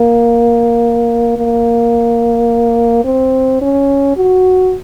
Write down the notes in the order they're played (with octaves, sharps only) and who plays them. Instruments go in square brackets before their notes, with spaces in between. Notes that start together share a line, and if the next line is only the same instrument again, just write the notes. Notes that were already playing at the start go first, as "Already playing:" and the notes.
Already playing: [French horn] A#3
A#3
C4
C#4
F#4